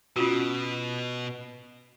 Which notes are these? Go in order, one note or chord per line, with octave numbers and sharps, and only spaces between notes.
B2 C#4 F4 F#4